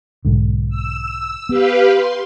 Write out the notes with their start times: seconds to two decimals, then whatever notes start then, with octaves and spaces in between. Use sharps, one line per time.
0.25 B1 G#2 D3
0.69 E6
1.49 B3 G4 B4 F5
1.91 C6